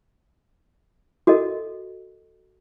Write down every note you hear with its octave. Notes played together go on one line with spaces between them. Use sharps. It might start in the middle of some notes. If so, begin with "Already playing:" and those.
F#4 A4 A#4 D#5